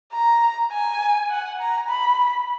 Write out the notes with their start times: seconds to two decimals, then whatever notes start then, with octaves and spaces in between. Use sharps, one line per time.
0.13 A#5
0.72 G#5
1.31 F#5
1.60 A#5
1.90 B5